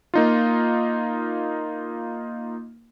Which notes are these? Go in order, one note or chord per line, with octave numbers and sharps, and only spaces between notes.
A#3 D#4 F4